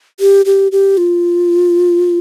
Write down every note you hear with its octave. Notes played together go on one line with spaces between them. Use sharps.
G4
G4
G4
F4